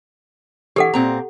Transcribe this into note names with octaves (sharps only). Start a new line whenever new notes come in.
E3 G4 A4 F#5
A#2 C4 A#5